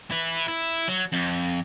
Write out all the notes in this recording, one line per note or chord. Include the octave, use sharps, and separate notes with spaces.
E4 B4
E4
F#3
F2